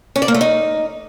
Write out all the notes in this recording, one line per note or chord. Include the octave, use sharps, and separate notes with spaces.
C#4
D5
A#3
A3
D#4